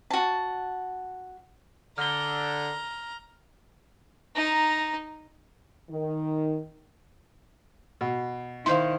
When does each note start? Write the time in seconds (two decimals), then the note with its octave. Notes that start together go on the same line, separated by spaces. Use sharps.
0.10 F#4 A5
1.98 D3 A#5 F6 G7
4.36 D#4 A#5
5.90 D#3
8.01 B2
8.66 D#3 E4 C5 F5 C6